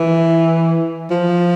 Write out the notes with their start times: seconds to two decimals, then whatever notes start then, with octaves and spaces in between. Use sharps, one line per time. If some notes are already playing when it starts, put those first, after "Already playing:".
Already playing: E3
1.10 F3